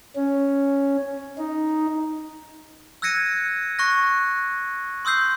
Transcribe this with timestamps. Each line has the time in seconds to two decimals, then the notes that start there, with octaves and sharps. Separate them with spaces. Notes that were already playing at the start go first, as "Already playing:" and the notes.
0.16 C#4
1.38 D#4
3.02 E6 F#6 G#6 A#6 C#7 D#7
3.79 C#6 F#6 A#6
5.05 C6 D#6 E6 G6 C7